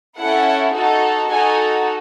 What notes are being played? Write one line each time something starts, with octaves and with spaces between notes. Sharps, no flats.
C#4 E4 A4 F#5
D#4 F#4 A4
D#4 F#4 A4 G#5